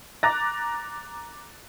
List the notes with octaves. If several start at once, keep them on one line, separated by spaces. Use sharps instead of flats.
A#5 D6 F#6 A6 A#6